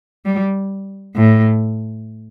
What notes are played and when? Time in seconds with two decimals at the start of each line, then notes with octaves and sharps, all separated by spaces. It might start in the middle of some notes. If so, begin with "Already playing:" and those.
0.26 G3
1.16 A2